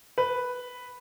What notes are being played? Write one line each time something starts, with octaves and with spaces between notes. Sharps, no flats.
B4